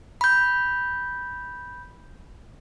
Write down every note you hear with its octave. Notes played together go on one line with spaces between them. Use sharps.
B5 G6